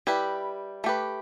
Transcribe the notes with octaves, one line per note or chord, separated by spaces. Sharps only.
G3 E4 G4 B4
A3 G4 B4